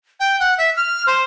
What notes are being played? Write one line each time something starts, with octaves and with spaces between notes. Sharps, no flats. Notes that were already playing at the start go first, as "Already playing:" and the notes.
G5
F#5
E5
F6
C5